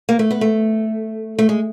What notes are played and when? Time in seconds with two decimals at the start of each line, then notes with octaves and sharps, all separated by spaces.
0.09 A#3
0.19 A3
0.31 B3
0.41 A3
1.39 A3
1.49 G#3